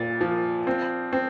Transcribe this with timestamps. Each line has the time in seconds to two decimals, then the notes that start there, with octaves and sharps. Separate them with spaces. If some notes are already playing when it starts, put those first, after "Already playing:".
Already playing: A#2 A6
0.21 F3
0.67 C4
1.13 C4